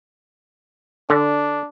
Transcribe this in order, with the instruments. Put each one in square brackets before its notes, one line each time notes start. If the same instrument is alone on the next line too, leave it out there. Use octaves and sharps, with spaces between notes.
[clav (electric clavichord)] D3 [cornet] D4